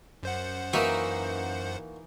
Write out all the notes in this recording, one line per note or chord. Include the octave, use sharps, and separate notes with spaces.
F#2 C5 F#5
E3 A#3 D#4 F#4 E5